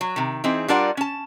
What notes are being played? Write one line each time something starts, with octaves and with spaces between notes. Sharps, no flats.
F#3
C3 D#3
E3 C4 D#4 G#4
G3 D4 F4 A#4 D5 F#5
C#4 A5